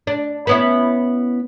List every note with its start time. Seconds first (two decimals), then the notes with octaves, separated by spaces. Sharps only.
0.07 D4
0.47 B3 C#4 E4